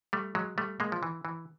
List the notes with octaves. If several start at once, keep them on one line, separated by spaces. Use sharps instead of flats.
G3 A3
F#3 G#3
G3 A3
G#3 A#3
F3
E3
E3